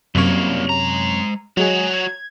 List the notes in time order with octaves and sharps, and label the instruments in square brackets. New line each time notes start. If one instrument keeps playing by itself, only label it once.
[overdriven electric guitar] C2 A#3 [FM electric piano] F#2 C3 C#5
[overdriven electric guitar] G#3 A#5
[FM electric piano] F#3 G#3 G#4 [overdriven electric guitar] F#4 C#5
[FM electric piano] G#6